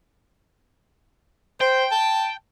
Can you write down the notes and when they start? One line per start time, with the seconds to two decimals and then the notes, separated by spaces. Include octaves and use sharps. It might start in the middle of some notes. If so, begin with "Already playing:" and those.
1.61 C5 G5
1.92 A5